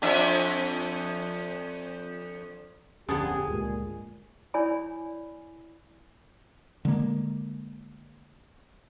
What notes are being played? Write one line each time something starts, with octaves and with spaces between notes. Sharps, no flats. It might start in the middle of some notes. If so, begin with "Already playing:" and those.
F2 D4 E5
D1 F2 D3 F3 B3 C#4 G4 G#4
C#2 G2 A#2 G#3
E4 C#5 D5 G#5 B5
D3 G#3 A#3